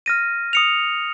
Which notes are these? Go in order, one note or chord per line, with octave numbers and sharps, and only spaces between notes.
F6 A#6 D#7
D#6 C#7 F7